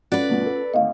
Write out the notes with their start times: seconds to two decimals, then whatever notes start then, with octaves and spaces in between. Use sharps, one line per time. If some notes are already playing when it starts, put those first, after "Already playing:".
0.12 C#4 F4 F#4 B4 D5 F#5
0.29 D2 G2 B2
0.46 A4
0.74 G#1 D2 D#5 F5